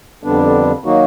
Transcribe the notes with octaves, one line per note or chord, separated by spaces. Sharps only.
F2 D3 G3 B3 D4
D#3 F#3 A#3 D#4 F#4